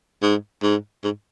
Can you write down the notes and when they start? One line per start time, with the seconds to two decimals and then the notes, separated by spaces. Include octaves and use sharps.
0.22 G#2
0.63 G#2
1.04 G#2